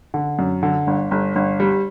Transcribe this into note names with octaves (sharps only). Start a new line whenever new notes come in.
D3
F#2
D3
G1
G1
G1
G3